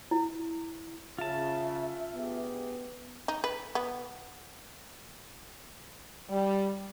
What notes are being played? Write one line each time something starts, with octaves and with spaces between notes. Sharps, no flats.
E4
C#3 F4 E5 A5
D2 B3 G4 G#4
D#4
B4
B3
G3